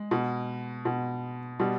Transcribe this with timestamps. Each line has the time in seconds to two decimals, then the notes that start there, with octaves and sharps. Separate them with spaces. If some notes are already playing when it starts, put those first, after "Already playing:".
Already playing: G#3
0.11 B2
0.85 B2
1.60 B2 G3